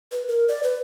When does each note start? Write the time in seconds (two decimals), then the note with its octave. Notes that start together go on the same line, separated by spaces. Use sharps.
0.12 B4
0.28 A#4
0.48 D5
0.63 B4